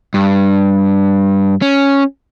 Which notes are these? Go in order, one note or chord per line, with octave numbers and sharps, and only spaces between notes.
G2
C#4